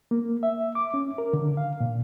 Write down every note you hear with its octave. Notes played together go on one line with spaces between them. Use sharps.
A#3
E5
D6
C#4
A#4
D3
F5
A#2